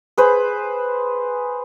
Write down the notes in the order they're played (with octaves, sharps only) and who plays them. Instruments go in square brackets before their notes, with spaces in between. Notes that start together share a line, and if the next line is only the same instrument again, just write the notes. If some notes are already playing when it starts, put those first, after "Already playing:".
[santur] G#4 B4 C5